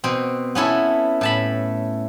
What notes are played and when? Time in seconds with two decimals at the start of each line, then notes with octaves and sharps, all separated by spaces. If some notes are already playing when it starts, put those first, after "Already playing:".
0.04 B2 C4
0.55 B3 C#4 E4 A4
1.21 A2 A5 B5